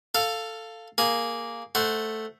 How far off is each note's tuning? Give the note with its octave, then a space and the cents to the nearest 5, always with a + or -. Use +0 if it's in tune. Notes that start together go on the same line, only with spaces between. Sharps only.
A4 +10 F5 +0
A#3 +0 G#4 +0
A3 +0 C5 -10 F#5 +0